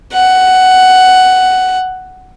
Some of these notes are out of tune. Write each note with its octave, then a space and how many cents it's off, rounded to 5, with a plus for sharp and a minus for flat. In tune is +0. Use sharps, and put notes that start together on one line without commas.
F#5 +10